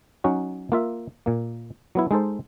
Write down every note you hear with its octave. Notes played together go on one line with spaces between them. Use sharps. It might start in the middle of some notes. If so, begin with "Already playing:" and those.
F#3 C#4 D#4 F#4
A#3 F4 E5
A#2 A#3
F#3 B3 E4
G#3 D#4 A4 C5